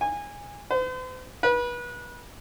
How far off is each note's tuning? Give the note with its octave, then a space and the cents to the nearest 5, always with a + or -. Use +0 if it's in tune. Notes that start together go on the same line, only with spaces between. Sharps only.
G#5 -20
C5 -45
B4 -30